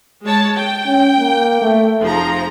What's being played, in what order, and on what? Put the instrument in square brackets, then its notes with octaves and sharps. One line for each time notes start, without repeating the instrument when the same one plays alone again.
[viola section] G#3 C#5 A5
G5
[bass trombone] C#4
A#3
A3
[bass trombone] F1 [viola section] F3 G#4 A#5